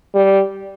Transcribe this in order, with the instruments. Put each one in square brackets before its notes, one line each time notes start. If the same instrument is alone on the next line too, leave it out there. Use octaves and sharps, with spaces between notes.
[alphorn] G3